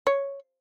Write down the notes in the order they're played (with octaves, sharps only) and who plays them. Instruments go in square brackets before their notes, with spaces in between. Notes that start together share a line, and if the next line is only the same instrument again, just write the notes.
[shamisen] C#5